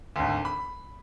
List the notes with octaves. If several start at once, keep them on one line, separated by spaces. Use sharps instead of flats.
G#1 D2
B5